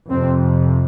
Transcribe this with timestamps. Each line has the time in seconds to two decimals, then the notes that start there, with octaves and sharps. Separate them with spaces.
0.10 F2 C3 C4